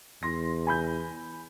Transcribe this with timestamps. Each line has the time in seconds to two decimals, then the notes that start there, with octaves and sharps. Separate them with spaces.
0.23 E2 C6 A#6
0.67 G#5 B5 G6